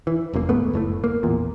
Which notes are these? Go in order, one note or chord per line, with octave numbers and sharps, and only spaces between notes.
E3
F1 F#2 A2 A#3
D1 G#2 A3 B3
F#1 A2 A3
A#3
A1 E2 A#2